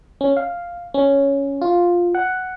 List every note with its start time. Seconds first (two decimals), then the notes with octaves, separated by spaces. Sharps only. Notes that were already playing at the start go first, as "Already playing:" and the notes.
0.21 C#4
0.37 F5
0.94 C#4
1.62 F4
2.15 F#5